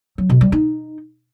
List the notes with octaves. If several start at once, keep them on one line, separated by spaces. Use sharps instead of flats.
F#3
B2
G3
D#4